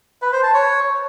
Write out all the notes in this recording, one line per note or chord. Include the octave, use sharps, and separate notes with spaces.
B4
C5
A5
C#5